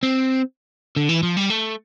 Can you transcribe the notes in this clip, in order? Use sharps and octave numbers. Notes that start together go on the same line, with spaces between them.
C4
D3
E3
F3
G3
A3